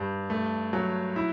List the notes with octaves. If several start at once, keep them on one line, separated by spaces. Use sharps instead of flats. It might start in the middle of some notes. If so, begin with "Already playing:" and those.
Already playing: G2 G3
A3
F#3
E4